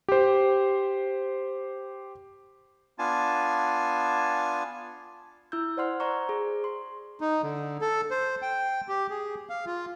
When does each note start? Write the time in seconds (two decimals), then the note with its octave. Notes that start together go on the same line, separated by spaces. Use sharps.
0.08 G4 C5
2.99 B3 D4 F4 G#5 A5
5.52 E4 E6 G6
5.77 C5 D5 F#5 C6 F6
6.00 C5 D5 A#5 C#6
6.29 G#4
6.64 C6
7.21 D#4
7.43 D3
7.82 A4
8.11 C5
8.42 G5
8.88 G4
9.10 G#4
9.49 F5
9.66 F4